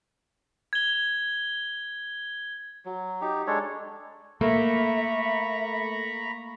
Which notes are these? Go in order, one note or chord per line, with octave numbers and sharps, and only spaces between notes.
G#6 G7
F#3
D#4 G4
G#3 D4 A4 C#5
A3 A#3 E5 A#5 B5 C#6